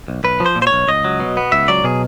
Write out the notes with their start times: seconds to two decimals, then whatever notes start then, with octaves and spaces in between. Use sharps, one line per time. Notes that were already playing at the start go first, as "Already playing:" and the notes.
0.08 B1
0.24 B1 B4
0.40 F3
0.46 C5
0.56 A#2
0.62 C5
0.67 C#5
0.73 B1
0.88 C#2 D#5
1.05 F#3
1.20 B2
1.37 B3
1.52 C#2 E5
1.68 F#3 D5
1.84 B2 G#4